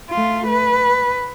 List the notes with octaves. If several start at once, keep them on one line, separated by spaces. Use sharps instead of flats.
A3 F4
B4